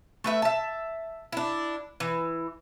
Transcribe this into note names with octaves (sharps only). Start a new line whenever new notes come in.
A3 B4 E5
E5 A5
D4 E4
E3